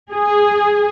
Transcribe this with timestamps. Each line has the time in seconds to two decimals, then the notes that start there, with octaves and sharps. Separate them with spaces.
0.11 G#4